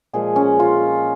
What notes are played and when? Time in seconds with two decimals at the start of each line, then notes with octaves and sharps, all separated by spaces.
0.13 A#2 F3 G#3 G#4
0.36 C#4
0.60 F4